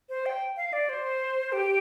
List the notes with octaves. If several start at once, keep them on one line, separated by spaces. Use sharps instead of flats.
C5
G5
F5
D5
C5
G4